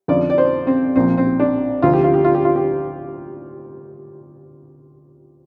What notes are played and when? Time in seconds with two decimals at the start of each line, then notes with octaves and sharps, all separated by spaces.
0.08 F2 D3 F3 D5
0.30 D5
0.38 C5
0.67 C4
0.96 A#1 A#2 F3 C4
1.18 C4
1.40 D4
1.82 D2 C3 F3 F4
1.93 G4
2.04 F4
2.14 G4
2.24 F4
2.35 G4
2.45 F4
2.56 G4